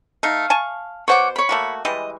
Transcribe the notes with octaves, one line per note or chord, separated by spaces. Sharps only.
A3 D#4 F5
G#5 A5 C#6
B2 C5 C#5 F#5 D6
C#5 B5
A3 A#3 F#4
E3 G3 G#3 D#5